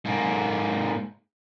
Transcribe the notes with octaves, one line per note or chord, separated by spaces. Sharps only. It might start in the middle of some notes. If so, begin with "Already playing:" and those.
G#2 A#3